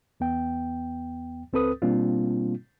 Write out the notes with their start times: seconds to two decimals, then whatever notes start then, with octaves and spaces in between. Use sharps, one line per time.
0.20 E2 B3 G5
1.53 C#2 C4 A4 B4 D#6
1.82 B2 G3 A#3 C4 D4 F4